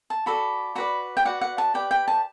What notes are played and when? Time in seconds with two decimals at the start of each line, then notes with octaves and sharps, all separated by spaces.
0.10 A5
0.26 F#4 A4 D5 B5
0.75 F#4 B4 D5 B5
1.17 G5
1.25 F#4 B4 D5 F#5
1.41 F#5
1.58 A5
1.74 G4 B4 D5 G5
1.91 G5
2.08 A5